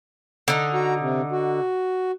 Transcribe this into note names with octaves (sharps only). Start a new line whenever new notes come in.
D3 D#4
F#4 A#5
C3
F#4